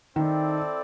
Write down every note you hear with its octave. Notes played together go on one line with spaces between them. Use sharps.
D#3 C4 E4 A4 D5